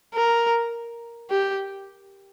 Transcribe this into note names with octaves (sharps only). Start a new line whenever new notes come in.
A#4
G4